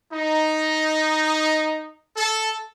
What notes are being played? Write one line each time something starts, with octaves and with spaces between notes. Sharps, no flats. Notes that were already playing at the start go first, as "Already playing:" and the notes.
D#4
A4